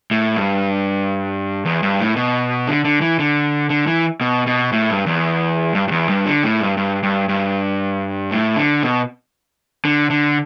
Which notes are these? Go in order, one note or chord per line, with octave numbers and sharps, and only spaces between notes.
A2
G2
E2
G2
A2
B2
D3
D3
E3
D3
D3
E3
B2
B2
A2
G2
E2
G2
G2
E2
G2
D3
A2
G2
G2
G2
G2
A2
D3
B2
D3
D3